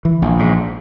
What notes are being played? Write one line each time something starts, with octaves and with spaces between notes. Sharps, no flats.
E3
A#1
G#2